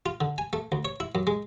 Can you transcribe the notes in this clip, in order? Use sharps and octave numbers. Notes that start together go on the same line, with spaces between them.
F4
D3
G#5
A3
D2
C#5
E4
F#2
G#3